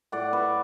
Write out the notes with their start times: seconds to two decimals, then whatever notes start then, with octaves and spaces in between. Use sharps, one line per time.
0.12 A2 D5 F#5
0.33 B4 E5